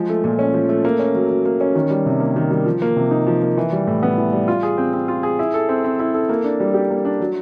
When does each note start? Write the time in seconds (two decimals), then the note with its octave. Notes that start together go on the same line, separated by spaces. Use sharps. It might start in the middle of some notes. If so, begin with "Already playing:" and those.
Already playing: F3 G#3
0.09 A3
0.24 A#2
0.39 C#4
0.54 F3
0.69 A3
0.85 A#3
0.99 C#4
1.15 F#3
1.30 F#3
1.46 A#3
1.61 C#4
1.75 D#3
1.90 G3
2.06 C3
2.20 A#3
2.36 D#3
2.51 G3
2.65 F3
2.82 A#3
2.97 C3
3.11 D#4
3.27 F3
3.42 A#3
3.57 E3
3.72 G3
3.87 A2
4.03 B3
4.18 E3
4.33 G3
4.48 F4
4.63 G#4
4.77 C4
4.93 C4
5.08 F4
5.23 G#4
5.39 E4
5.54 A4
5.69 C4
5.84 C4
5.99 E4
6.14 A4
6.29 A#3
6.44 D4
6.60 G3
6.74 G4
6.91 A#3
7.05 D4
7.20 F#3